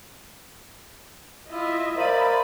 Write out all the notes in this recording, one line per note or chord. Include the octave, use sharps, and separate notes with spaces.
E4 F4 D#5 E5
A#4 C5 D5 F5 B5 D#7